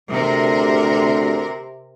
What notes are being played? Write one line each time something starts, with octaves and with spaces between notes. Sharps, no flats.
D2 C3 A#4